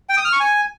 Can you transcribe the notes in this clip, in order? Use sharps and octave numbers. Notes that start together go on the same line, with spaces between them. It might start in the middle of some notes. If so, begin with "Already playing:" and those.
G5
D#6
F6
C#6
G#5